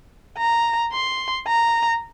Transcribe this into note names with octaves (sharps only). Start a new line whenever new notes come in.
A#5
C6
A#5